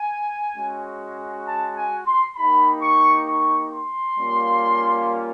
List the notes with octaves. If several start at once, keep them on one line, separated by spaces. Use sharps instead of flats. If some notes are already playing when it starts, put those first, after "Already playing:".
Already playing: G#5
G#3 C#4 F#4
A5
G#5
C6
A#3 D#4 G4 B5
C#6
C#6
C6
G3 A#3 C#4 F4